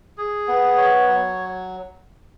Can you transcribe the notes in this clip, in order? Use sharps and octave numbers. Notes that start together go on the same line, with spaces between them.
G#4
B3
C#5
F#3